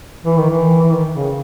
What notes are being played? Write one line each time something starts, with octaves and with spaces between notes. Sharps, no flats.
E3
D#3
E3
E3
D#3
C#3